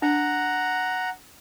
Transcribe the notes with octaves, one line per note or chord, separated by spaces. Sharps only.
D4 F#5 A#5